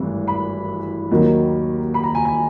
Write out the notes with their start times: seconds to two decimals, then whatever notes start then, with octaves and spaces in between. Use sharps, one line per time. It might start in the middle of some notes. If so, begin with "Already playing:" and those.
Already playing: G#1 G2 E3 A3
0.28 B5
1.11 D#2 D#3 F#3
1.94 B5
2.04 A#5
2.15 G#5
2.25 G#5